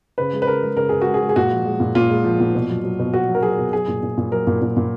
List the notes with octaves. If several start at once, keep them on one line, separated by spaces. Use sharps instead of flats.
C#3 B4
G#3
B4
C#3 A#4
G#3
C#3 A#4
C#3 G#4
F#4
G#3
G#4
G#3
G#4
A#2 F#4
F3
G#3
A#2
A#2 F4
G#3
F3
A#2
B2
F#3
F#3
B2
B2 F#4
F#3
A#4
F#3 G#4
B2
F#3 G#4
A#2
A#2
A#2
F#3 A#4
A#2
A#2
A#2